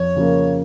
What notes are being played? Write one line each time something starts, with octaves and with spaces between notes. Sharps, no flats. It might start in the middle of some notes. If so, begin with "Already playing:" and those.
Already playing: F2 C#5
C#3 F3 A#3